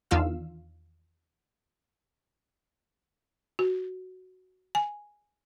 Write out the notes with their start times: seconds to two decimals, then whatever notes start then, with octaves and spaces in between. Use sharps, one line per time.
0.11 E2 D#3 D4 F4 F5 E6
3.59 F#4
4.75 G#5